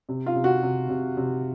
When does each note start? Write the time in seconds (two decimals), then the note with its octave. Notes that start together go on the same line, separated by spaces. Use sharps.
0.09 C3
0.26 F4
0.36 C3
0.44 F#4
0.63 C3
0.89 C3
1.17 C3